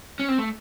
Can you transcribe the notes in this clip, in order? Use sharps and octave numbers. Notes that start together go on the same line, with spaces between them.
C#4
C4
A3